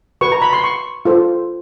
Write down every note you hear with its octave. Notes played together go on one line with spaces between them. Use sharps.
F#4 B4 C#6
A#5
B5
C6
C#6
F4 A4 C5